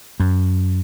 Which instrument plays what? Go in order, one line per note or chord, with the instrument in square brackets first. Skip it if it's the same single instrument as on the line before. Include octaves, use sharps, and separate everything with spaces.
[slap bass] F#2